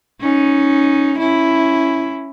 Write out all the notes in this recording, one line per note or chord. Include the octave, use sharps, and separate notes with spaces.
C#4 D#4
C#4 E4